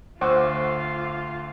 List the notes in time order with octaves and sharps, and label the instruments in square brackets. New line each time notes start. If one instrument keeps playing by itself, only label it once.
[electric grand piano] D2 D6 E6 [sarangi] F4 [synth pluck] C5 F#5 C#6